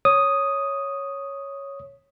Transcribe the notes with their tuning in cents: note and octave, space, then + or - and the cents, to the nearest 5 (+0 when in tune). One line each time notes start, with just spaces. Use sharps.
C#5 +0 D#6 +0